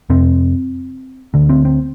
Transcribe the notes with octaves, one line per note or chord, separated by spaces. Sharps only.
F2 C3 C4
D2 D3
C4
C4